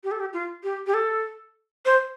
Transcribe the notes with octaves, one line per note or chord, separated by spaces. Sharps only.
G4
A4
G4
F4
G4
G4
A4
C5